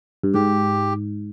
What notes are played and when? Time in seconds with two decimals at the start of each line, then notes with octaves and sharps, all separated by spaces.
0.23 G2
0.34 G#2 G4